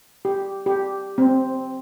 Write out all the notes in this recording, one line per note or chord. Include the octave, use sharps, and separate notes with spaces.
G4
G4
C4